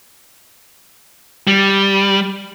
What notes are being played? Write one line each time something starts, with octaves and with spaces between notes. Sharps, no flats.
G3